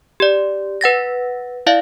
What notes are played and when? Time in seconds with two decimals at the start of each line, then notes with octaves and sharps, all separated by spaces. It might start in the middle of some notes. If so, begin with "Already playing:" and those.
0.20 G4 D5
0.81 B4 F#5 A6 A#6
1.67 E4 D5 E5 F5